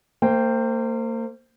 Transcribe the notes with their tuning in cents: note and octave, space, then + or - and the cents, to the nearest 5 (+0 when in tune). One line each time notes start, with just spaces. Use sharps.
A#3 -35 C5 +0 G5 +0